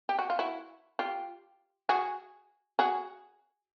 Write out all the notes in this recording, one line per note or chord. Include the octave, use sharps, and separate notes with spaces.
G4
F#4
F4
E4 F#4
F4 G4
F#4 G#4
F#4 G#4